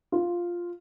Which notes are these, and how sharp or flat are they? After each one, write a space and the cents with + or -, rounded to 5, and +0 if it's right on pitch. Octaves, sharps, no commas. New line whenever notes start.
F4 +0